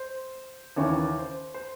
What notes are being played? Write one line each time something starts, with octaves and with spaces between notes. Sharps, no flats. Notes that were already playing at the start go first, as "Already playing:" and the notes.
Already playing: C5
D#2 C#3 E3 C#5
C5
C5